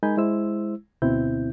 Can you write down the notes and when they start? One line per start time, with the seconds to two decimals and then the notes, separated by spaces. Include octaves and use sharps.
0.03 G#3 D#4 A#4 G#5 B5 G6
0.17 G#3 E4 C5 E6
1.02 D2 B2 C4 E4 G6